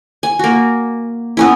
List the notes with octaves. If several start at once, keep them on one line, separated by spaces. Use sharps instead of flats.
G#5
A#3 F#4
B3 C#4 E4